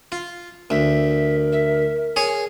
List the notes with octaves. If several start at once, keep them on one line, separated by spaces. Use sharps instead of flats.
F4
D2 A#4 E5
E5
G#4 C#5 G#5